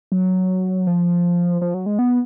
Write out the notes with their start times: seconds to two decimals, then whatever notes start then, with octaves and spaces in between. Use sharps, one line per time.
0.12 F#3
0.87 F3
1.61 F3
1.74 F#3
1.86 G#3
1.99 B3